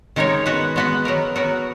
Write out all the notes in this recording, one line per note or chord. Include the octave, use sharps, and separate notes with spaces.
D#3 G#3 D#4 A#4 C#5
G#3 B3 F#4 B4
G#3 B3 F#4 B4
F#3 B3 F#4 A#4
F#3 B3 F#4 A#4